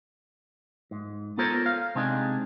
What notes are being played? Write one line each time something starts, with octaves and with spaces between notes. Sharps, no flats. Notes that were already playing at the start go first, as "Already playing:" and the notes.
G#2
B3 F4 A4 A#4 C5 C#5
F5
C3 G#3 C4 D4 D#4 G#4